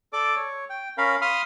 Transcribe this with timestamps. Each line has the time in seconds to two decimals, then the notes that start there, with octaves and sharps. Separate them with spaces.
0.13 A4 D5 D6
0.36 C#5
0.70 G5
0.98 C#4 A#4 F5 B5
1.22 F5 B5 C6 D#6 F6